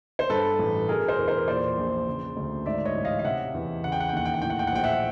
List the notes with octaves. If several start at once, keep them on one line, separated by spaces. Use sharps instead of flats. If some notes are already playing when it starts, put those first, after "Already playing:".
C5
G2 A4 B4
A1
B2 G#4 A#4
A#4 C5
E2
A#4 C5
A#2 C5 D5
A#1
C#3
D2
G#2 D5 E5
C#5 D#5
A1
D#5 F5
F5
C3 E5 F#5
E2
C#3 F#5
G5
F#5
G5
D#2 F#5
G5
F#5
A2 G5
F#5
G5
F#5
A#1 G5
E5 F#5